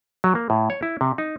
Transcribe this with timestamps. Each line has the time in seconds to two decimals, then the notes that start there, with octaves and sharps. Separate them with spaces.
0.24 F#3
0.35 A#3
0.50 A2
0.70 C#5
0.83 E4
1.01 C3
1.18 D#4